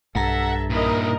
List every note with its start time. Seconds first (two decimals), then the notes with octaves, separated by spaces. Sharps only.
0.15 B1 G2 A4 E5 F#5 A#5 A#6
0.70 A#2 D#4 E4 A#4 D#5